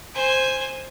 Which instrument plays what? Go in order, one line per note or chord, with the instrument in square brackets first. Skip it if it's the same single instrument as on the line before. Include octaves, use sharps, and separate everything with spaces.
[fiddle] C5 G#5